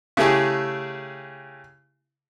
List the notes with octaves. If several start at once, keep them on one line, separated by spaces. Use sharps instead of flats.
C#3 A3 E4 G4 G#4